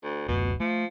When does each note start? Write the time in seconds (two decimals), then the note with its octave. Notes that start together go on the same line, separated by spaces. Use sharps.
0.04 D2
0.28 D1 F#2 B2 A3
0.60 F3 A3